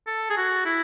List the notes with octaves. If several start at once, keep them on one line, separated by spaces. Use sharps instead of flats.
A4
G#4
F#4
E4